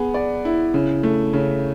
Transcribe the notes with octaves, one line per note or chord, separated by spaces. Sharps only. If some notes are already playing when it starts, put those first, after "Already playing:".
Already playing: B3 G#4
D5
E4
C#3
A3
C#3